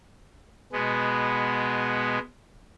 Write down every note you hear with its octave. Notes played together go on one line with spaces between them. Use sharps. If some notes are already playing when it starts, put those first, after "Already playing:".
B2 G#3 B3